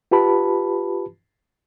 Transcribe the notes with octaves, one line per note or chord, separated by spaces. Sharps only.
F4 G4 B4 A5 B5